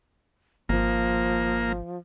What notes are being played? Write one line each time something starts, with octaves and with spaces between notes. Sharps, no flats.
G#1 F3 A#3